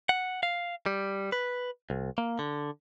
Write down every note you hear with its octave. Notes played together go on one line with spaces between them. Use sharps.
F#5
F5
G3
B4
C2
A#3
D3